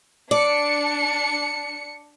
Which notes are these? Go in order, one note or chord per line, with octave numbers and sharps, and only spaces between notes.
D4 D5 C#7